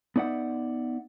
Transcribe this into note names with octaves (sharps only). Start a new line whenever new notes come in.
B3 D#4 D5 E5 F#5